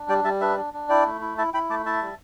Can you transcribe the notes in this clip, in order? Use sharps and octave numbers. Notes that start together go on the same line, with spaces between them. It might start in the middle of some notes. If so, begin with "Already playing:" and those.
Already playing: D4
G3 D5 G5
G3 E5 A5
D4 B4 E5
D4
D4
E4 D5 G5
A3
E4
E4 E5 A5
E4 G5 B5
A3 A5 D6
E4 E5 A5
G3